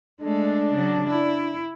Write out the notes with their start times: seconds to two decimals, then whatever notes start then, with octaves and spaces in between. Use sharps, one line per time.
0.22 G#3 A3 D4
0.73 C#3 F#3
1.07 E4